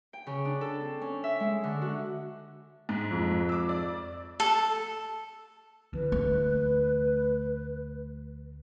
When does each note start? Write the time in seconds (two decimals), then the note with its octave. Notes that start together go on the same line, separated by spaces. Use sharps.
0.13 G5
0.27 C#3
0.45 D4
0.61 A4
0.81 C4
1.01 C#4
1.24 E5
1.40 G#3
1.64 D3
1.81 F#4
2.89 G#2
3.11 F2
3.49 D6 E6
3.69 D5
4.40 A4
5.93 D2 E3 B4
6.12 A3